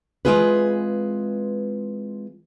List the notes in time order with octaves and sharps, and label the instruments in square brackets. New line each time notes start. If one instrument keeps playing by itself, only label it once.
[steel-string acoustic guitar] E3 G#3 C4 F4 G#4 B4